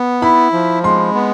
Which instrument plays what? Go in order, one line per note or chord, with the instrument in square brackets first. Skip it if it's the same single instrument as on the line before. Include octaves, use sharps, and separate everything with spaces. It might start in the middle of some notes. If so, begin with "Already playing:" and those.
Already playing: [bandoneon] B3
[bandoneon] E4 [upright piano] B5
[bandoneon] F3
[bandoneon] G#3 [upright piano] C6
[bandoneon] B3